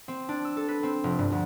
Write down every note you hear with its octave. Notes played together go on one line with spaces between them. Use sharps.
C4
D4
E6
A4
B4
C4
F1
G2
D2